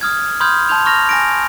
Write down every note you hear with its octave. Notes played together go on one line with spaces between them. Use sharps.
D#6 F6 G#6
B5 C6 D#6 F6 G6 G#6
A5 C6 G6 F7
B5 C#6 F6 A#6 F7
G#5 A#6 D7